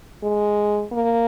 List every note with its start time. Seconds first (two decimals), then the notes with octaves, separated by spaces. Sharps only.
0.23 G#3
0.92 A#3